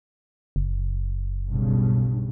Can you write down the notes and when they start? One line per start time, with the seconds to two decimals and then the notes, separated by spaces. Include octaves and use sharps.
0.56 F#1
1.48 B1 G2 C#3